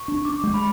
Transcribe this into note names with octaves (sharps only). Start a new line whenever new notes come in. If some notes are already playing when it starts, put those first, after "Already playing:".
Already playing: C#6
D4
D4 D6
G#3
B5